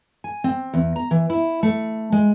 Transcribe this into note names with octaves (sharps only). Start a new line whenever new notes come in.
G#5
C4
E2
A#5
E3
E4
A3
G#3